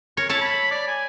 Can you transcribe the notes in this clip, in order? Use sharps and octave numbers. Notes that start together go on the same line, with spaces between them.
A#4 C#5
E4 C#5 A5
B5
D5
G#5